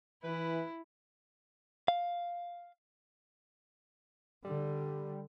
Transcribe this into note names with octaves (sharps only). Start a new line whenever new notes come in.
E3 E4 B4
F5
D3 G3